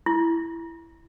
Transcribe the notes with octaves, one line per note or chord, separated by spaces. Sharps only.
E4